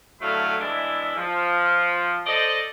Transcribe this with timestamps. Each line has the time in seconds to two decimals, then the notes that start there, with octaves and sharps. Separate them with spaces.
0.21 A2 D3 F#3 A3 F5 B5
0.60 E3 G#3 D4 E4
1.16 F3
2.26 A4 C5 D5 D#5